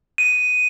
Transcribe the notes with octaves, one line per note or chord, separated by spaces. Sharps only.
D#7